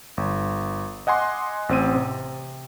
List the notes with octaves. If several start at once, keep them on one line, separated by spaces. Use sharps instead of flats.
G1
D#5 F#5 G#5 C6 D6
A1 C4 D#7
C3